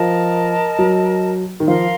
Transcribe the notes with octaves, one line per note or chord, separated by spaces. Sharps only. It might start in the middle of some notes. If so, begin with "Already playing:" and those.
Already playing: F3 A#4 D#5 A5
F#3
D#3
F3 A#4 F5 C6